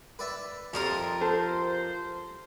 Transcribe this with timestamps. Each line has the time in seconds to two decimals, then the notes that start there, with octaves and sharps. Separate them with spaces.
0.19 B4 D5 E5
0.73 F2 C3 F3 F4 A#4 D#6
1.21 A4 C5